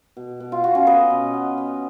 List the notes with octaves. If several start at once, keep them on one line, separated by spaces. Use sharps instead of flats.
B2
B2
F4
B3 F#4
C#4 F4
B3 B4 D#5
B2
B3
B3